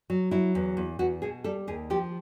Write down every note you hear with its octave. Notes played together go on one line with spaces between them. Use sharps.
F#3
F#3 E4
E2
E2
E2 F#4
B2 G#4
G3 A4
D#2 G#4
F3 G4